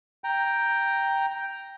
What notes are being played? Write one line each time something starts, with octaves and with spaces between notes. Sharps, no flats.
G5 A#5